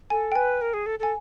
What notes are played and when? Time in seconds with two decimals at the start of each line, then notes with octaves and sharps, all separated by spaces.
0.10 A4 G#5
0.32 G5
0.35 B4 G#5
0.61 A#4
0.74 G#4
0.86 A4
0.99 A4 G#5